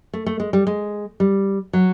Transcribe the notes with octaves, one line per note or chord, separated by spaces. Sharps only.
A3
A3
G#3
G3
G#3
G3
F#3